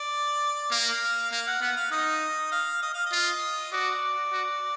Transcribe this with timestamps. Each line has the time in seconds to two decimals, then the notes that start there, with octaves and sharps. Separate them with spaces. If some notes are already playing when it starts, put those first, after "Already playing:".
Already playing: D5
0.71 A#3 F5
1.32 A#3 F5
1.47 F#5
1.61 B3 F#5
1.77 F5
1.91 D#4 D#5
2.52 F5
2.83 D#5
2.94 F5
3.06 D#5
3.12 F4
3.73 F#4 D5
4.33 F#4